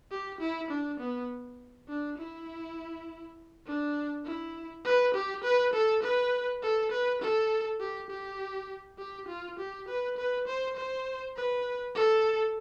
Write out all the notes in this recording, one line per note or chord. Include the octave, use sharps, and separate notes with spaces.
G4
E4
D4
B3
D4
E4
D4
E4
B4
G4
B4
A4
B4
A4
B4
A4
G4
G4
G4
F4
G4
B4
B4
C5
C5
B4
A4